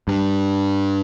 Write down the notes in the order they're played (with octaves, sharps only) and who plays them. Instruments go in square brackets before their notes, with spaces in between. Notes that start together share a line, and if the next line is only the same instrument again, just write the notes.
[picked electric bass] G2